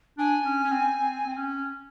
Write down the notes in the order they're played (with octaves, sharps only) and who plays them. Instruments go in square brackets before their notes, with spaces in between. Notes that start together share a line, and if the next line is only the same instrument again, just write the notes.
[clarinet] D4 [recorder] G#5
[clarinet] C#4
C#4
C4
C4
C4
C#4